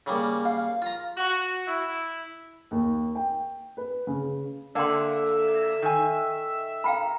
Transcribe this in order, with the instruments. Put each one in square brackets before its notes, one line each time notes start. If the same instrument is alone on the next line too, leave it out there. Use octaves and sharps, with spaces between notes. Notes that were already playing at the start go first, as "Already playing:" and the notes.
[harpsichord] C#3 G3 A#3
[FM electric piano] F5
[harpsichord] F4 A#5
[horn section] F#4
E4
[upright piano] D#2
G5
B4
C#3
[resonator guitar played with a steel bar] D3 A#3 [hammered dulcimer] A4 [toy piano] D5 G5 C6 [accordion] E5 E6
[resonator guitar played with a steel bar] D#3 G#5
[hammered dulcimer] A#4 [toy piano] F5 G5 B5